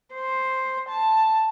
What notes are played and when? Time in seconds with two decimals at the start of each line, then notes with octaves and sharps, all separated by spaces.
0.14 C5
0.89 A5